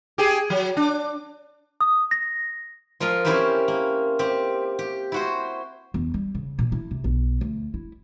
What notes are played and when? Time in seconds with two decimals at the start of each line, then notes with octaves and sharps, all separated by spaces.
0.18 G4 G#4
0.50 F#3
0.77 D4
1.81 D#6
2.11 A#6
3.00 F3 F4 A#4 D#5 F5
3.25 C4 C#4 E4 G4 A#4 C5
3.68 A#3
4.19 C4 G4
4.79 G4
5.12 E4 F#4 C5
5.94 E2
6.14 G3
6.35 C#3
6.59 A#2
6.72 E4
6.91 C3
7.04 B1
7.41 D2
7.74 E4